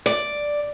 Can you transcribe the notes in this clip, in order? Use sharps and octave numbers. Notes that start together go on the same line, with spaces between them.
D5